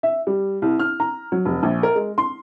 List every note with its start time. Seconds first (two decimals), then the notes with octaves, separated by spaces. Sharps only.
0.03 E5
0.27 G3
0.62 C2
0.79 F6
1.00 A#5
1.32 F#3
1.46 F1
1.63 A#1
1.83 A#4
1.95 G#3
2.18 C6